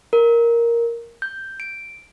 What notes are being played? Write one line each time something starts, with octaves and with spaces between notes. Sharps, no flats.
A#4
G6
D7